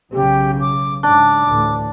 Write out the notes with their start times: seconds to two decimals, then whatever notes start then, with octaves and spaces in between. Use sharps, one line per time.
0.13 B1 C#3 F#3 G4
0.60 D6
1.03 G#2 C#3 D4 D6
1.46 A1 D2 A2